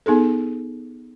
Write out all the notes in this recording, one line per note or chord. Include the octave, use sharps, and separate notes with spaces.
B3 D#4 G#4 A4